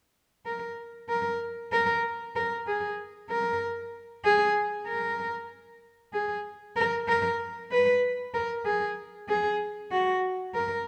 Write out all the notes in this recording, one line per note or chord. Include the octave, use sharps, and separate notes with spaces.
A#4
A#4
A#4
A#4
G#4
A#4
G#4
A#4
G#4
A#4
A#4
B4
A#4
G#4
G#4
F#4
A#4